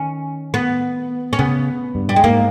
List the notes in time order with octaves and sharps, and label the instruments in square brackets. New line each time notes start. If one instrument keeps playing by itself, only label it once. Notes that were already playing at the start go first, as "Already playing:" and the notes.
Already playing: [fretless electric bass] D#3 [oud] C#4
[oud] B3
C#4
[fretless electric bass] C#3 [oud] B3
[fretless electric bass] G2
[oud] G3
G#3
[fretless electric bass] G#2 [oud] A#3